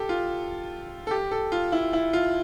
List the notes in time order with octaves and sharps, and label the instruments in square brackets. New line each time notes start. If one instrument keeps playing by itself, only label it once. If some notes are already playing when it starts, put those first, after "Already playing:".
Already playing: [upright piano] G4 A4
F4
A4
G4
A4
F4
E4
E4
F4